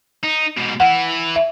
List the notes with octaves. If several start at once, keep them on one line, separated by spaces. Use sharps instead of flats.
D#4
G#2 B2
E3 E4 F#5
E5